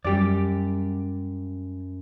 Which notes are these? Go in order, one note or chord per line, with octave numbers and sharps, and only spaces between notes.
F#2 G3 G4 D5